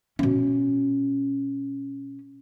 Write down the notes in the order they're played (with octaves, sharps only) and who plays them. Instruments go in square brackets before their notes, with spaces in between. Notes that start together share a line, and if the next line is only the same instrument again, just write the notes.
[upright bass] B2 C#4